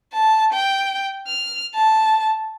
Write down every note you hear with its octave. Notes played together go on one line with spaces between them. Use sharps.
A5
G5
F6
A5